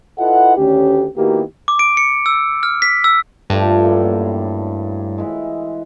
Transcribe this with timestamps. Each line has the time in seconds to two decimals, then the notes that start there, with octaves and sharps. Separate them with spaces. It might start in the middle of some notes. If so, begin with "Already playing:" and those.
0.19 E4 F4 A4 B4 D#5 F#5
0.57 D2 D#3 C#4 G4
1.17 D#3 A#3 B3 E4 F#4 G4
1.68 D6
1.79 D7
1.97 C#7
2.26 E6
2.63 F6
2.82 B6
3.04 E6
3.50 G2 F3 A3 D5
3.83 F#2 A2 A#3
5.18 E3 G#3